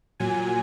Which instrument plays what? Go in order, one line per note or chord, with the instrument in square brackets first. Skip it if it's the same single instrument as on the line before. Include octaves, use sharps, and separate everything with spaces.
[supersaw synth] A#2 F#3 G#5